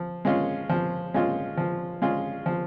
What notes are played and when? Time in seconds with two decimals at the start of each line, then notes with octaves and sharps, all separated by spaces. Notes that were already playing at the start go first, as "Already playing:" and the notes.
Already playing: F3
0.25 G#3 C#4 F4
0.69 F3
1.14 G#3 C#4 F4
1.57 F3
2.02 G#3 C#4 F4
2.46 F3